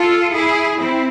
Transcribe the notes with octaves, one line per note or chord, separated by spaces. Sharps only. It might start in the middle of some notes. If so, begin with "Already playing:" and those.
Already playing: F4 A4
E4 G#4
C4 E4